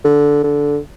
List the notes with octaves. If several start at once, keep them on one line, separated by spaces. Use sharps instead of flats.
D3
D3